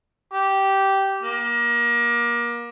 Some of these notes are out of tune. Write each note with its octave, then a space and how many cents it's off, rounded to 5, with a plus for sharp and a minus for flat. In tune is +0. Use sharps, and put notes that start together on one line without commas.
G4 -10
A#3 +30